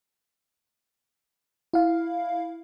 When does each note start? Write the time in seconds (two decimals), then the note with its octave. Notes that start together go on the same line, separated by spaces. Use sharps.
1.73 E4 F5